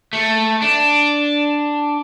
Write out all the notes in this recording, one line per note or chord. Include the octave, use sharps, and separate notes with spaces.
A3
D4